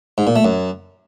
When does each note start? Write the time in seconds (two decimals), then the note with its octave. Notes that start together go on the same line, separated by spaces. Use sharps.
0.18 G#2
0.27 A#2
0.36 A3
0.45 F#2